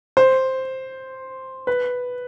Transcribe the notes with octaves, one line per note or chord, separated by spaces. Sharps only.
C5
B4